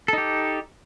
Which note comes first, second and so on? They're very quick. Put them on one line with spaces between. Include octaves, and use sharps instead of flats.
A4 D#4 G4